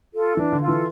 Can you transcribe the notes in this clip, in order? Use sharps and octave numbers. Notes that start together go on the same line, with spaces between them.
F4 A4
E3 D4
D3
F4 A4
E3